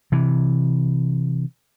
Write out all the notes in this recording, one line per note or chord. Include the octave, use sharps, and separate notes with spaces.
C3 E3